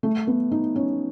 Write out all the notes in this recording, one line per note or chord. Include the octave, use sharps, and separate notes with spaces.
A3
B3
D#4
C#4